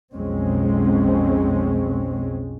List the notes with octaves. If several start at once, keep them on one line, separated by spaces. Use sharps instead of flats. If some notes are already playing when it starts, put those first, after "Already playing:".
B1 F2 G#3 C4 C#4